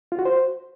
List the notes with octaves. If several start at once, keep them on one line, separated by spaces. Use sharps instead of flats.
F4
F#4
C5